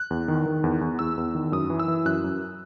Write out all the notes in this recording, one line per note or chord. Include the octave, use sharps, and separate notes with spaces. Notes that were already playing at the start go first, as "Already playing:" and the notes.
Already playing: F#6
E2
D#3
D#3
E2
E2
E2 E6
E2
D#3
F#2 D#6
E3
E6
E3
F#2 F#6
F#2